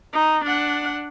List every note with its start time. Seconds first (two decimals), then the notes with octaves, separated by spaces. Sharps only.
0.13 D#4
0.45 D4 F#5